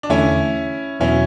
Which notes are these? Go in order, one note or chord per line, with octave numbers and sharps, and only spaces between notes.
D4
E2 D3 A3 C#4 E4
E2 B2 F#3 C#4 E4